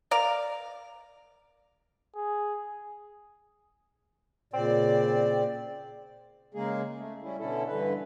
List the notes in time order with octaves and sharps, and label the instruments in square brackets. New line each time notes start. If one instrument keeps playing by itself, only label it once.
[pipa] A#4 D5 F5
[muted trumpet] G#4
[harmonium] A#2 C#3 D5 [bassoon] C4
[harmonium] C#3 G#3 A#3 G#4
A3
G3 C#4 E4
B2 D3 C#4 E4 A4
G2 D3 E3 B4